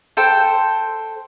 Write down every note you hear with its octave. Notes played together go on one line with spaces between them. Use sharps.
A4 C5 G5